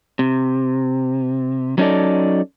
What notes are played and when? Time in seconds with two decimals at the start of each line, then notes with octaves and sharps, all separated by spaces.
0.19 C3
1.78 F#3 C#4 D#4 A4 D5